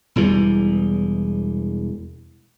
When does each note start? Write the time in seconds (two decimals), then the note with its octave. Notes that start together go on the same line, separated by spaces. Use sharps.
0.16 E1 E2 E3 G3